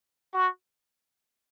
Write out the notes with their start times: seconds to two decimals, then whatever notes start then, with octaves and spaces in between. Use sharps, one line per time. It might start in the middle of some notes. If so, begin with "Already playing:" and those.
0.33 F#4